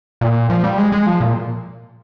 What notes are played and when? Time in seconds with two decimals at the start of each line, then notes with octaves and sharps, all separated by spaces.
0.21 A#2
0.50 F3
0.64 G3
0.78 G#3
0.92 G#3
1.06 F3
1.21 A#2